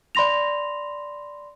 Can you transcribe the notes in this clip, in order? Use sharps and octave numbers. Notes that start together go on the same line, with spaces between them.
D5 B5 C6 A#6 F7